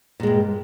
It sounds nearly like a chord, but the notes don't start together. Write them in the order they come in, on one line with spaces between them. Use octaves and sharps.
A#2 G#3 G2